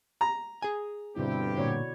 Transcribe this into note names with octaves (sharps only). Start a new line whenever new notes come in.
A#5
G#4 G#5
G2 B2 D3 C4 E4 G4
A#2 D3 F#4 C#5 D5